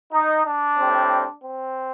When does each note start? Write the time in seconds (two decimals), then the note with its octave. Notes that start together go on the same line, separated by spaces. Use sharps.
0.12 D#4
0.45 D4
0.77 A2 G3 C4
1.44 C4